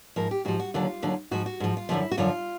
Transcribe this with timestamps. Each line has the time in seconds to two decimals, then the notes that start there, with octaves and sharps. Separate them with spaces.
0.16 G#2 F3 A#4
0.31 G4
0.45 G#2 F3 F#4
0.60 F#4
0.74 D#2 D3 F#3 F4
1.02 D#2 D3 F#3
1.31 G#2 F3 F#4
1.46 F#4
1.60 G#2 F3
1.77 F4
1.89 F#2 D3 F3 E4
2.11 F#4
2.18 F#2 D3 F3 F4